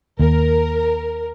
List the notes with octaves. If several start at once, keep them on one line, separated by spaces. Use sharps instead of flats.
D#2 A#4